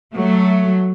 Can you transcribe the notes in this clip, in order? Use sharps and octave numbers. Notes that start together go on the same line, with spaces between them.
F#3 A3